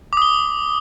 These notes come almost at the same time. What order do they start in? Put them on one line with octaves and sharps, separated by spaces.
D6 D#6 G7